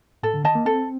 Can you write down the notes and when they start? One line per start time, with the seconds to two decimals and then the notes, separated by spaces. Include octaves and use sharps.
0.23 A2 A4
0.34 D3
0.44 D#3 D#5 A5
0.55 A#3
0.65 C4 A4